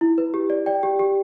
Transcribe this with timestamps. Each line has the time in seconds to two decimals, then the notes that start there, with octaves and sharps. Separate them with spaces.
0.01 E4
0.18 B4
0.34 G4
0.50 D5
0.66 D5 G5
0.83 G4
0.99 G4